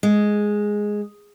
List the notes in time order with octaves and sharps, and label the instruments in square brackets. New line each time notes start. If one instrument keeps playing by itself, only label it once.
[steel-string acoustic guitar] G#3